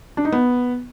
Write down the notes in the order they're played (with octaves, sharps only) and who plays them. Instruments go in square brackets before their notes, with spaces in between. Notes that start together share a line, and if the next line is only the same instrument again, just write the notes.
[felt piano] D4
D#4
B3